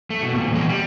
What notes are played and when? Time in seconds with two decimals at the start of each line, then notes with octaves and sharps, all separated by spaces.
0.10 A3
0.23 B2
0.35 D#2 A#2
0.52 E2 G#3
0.69 G3